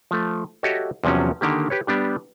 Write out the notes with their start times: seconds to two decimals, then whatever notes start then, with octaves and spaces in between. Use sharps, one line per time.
0.11 F3 A3
0.63 F#4 G4 A4 C#5 D#5 E5
1.04 E2 C3 F3 F#3 C#4
1.41 D3 D#3 A#3 G4
1.70 G4 B4 C#5
1.87 G3 B3 D4 G4